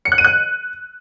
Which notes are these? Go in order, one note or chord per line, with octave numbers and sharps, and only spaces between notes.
C#7
F#6
D#7
F#6